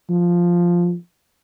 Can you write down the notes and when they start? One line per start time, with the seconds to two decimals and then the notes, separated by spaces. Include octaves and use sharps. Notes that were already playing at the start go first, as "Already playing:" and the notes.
0.10 F3